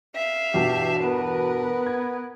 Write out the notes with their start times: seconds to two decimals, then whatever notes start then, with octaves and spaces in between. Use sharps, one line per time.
0.15 E5 F5
0.54 E2 G2 B2 G4
1.00 B3 A#4 B4
1.86 G#6